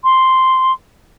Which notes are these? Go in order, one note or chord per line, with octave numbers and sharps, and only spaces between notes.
C6